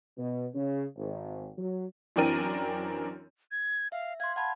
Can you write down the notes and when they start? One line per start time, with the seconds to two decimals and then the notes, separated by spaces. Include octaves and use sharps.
0.17 B2
0.54 C#3
0.96 G#1
1.58 F#3
2.16 F#2 E3 C4 D4 A#4 D#7
3.52 G#6
3.92 E5 F5
4.20 F5 C6 G#6
4.36 F#5 A5 B5 G#6